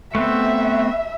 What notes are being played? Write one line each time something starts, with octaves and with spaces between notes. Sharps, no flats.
A3 B3 C4 E5